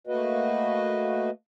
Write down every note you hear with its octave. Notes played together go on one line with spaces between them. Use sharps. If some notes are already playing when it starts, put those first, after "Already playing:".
A3 A#3 F#4 B4 D#5